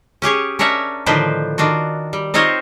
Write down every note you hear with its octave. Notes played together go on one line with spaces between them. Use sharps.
C#4 G4 G#4 C#5
C#4 D4 A#4 C#5 E5 F#5
A2 D3 D#3 F3 B4 C5
D#3 D4 F4 F#4
G3
C4 D#4 F4 C5 C#5 D#5